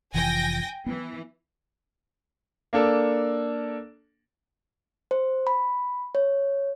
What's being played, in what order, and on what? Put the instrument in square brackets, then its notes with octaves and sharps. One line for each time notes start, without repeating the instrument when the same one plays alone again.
[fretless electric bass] F1 E3 F3 [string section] G5 G#5 A#6
[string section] E3 [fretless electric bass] B3
[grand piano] A#3 D4 A4
[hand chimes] C5
B5
C#5